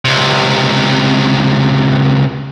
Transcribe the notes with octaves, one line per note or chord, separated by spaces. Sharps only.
C#2 C3